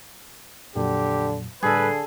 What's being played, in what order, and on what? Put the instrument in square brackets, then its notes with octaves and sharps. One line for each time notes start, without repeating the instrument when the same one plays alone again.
[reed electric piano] F2 A#2 F#3 [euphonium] D3 [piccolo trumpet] G4
[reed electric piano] A2 G3 [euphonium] D3 [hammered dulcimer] G#4 A4 [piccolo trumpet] B4